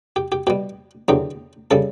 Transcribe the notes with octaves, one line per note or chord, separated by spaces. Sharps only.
G4
G4
B2 G3 G4
E2 D3 F#3 G4
C#3 G3 A4